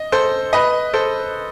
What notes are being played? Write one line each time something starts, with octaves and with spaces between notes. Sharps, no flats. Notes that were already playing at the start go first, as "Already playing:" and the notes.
Already playing: D#5
A4 C5
B4 D#5
A4 C5